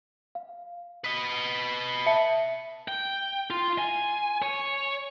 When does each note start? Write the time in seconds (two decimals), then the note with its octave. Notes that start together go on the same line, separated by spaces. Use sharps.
0.35 F5
1.04 B4 D#5
2.06 E5 A5 C#7
2.88 G5
3.50 F4
3.78 G#5
4.42 C#5